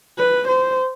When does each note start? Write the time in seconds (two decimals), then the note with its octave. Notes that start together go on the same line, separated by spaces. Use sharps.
0.18 B4
0.48 C5